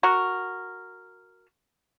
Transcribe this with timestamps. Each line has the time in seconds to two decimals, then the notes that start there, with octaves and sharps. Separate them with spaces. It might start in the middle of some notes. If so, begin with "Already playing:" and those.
0.03 F#4 A#4